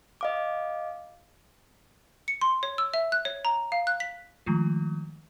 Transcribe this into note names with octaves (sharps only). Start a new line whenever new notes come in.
D#5 F5 D6
C#7
C6
C#5
E6
E5
F#6
C#5
A#5
F5
F#6
B6
D#3 F3 G#3 A3 F4